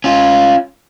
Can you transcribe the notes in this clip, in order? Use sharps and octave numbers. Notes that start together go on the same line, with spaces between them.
C#4 F4